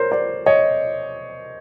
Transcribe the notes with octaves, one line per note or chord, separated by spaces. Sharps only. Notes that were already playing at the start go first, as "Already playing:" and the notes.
Already playing: A#4 C5 C#5
C5 D5
C#5 D#5